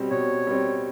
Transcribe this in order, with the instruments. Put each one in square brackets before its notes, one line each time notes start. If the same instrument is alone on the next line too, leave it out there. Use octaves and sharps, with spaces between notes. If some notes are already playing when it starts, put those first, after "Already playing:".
Already playing: [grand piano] B2 G3 C4
[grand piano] B2 [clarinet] C#5
[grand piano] G3 C4